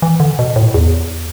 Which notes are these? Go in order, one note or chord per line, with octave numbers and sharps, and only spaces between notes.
E3
D3
B2
A2
E2